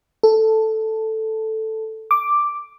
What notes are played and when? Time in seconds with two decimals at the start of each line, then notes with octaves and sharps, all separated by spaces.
0.23 A4
2.11 D6